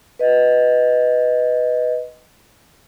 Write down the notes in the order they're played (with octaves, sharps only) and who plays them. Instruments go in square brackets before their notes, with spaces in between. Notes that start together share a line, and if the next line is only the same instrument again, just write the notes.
[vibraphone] B4 D#5